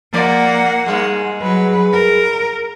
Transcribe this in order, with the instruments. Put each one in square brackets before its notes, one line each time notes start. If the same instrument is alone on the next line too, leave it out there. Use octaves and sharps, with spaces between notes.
[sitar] F3 E4 D5 [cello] A#3 F#5
[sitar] G#2 G3 G#3
[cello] F#3 B4
A#4